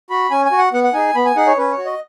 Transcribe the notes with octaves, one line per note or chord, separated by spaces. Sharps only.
F#4 B5
C#4 G#5
G#5
F#4
F#5
B3 F#5
F#5
D#4 G#4 G#5
B3 B5
G#5
D#4 G#4 F#5
C#5
C#4 B4
C#5
F#4
D#5